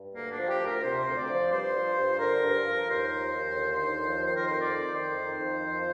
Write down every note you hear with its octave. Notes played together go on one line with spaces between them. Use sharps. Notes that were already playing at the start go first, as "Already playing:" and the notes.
Already playing: G2
D2 A#3
D4
F3
G4
D2
A#4
C3 C5
D2
D5
F3
G2 C5
F3
G2
D3 A#4
G2
F3
D#2 C5
F3
D#2
D3
D#2
F3
D#3 C5
A#4
F2 C5
D5
F2
D#3 C5
D#3
F2
F3